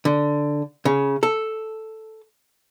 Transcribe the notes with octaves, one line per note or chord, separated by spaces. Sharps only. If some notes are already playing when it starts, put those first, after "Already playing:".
D3
C#3
A4